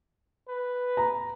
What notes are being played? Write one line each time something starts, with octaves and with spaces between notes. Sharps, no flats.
B4
A#5